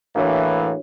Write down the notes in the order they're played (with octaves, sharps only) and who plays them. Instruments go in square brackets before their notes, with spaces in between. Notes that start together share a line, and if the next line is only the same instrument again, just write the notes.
[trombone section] A2 E3 [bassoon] A#3 [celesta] D4 F#4 C#5